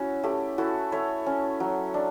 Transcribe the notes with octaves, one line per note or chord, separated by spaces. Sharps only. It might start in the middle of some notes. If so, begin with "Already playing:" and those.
Already playing: C#4 E4 F#4
A3 G4
E4 F#4 A4
A3 C#5 E5
C#4
F#3
D4